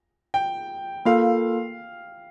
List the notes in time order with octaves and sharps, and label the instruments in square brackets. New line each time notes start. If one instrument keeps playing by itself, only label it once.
[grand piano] G5
[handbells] A#3 F4 A4 [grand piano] F5